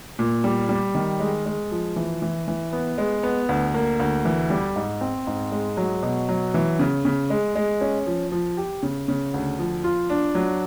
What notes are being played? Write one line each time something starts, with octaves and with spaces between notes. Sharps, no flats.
A#2
G3
G3
D#3
G#3
G#3
F3
E3
E3
E3
B3
G#3
B3
D2
A#3
D2
E3
G3
G#2
C4
G#2
G#3
F#3
B2
F#3
E3
C#3
C#3
G#3
G#3
C#4
F3
F3
G4
C#3
C#3
D2
F3
F4
D4
F#3